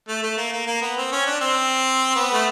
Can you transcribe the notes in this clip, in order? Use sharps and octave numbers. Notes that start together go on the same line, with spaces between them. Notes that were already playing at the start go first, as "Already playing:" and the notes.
A3
A3
A#3
A#3
A#3
B3
C4
C#4
D4
C4
B3
A3